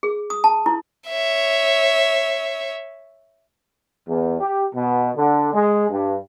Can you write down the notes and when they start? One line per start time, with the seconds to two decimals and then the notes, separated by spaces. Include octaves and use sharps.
0.03 G#4
0.30 D#6
0.44 A5
0.66 E4
1.09 C#5 E5
4.07 E2
4.41 G4
4.74 B2
5.16 D3
5.53 G#3
5.90 G2